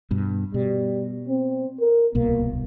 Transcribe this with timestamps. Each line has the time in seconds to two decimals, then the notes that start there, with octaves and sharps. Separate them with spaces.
0.11 G2 B2
0.54 B2 G3
1.29 C4
1.80 A#4
2.15 D1 C2 B2 A#3